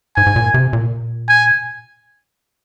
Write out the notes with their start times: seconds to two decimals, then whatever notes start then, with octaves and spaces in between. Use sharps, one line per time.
0.16 G#2 G#5
0.27 G#2
0.36 A#2
0.54 C3
0.73 A#2
1.28 G#5